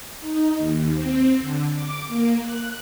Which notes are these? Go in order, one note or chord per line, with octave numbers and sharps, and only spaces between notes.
D#4
D#2
C4
D3
D6
A#3
F#6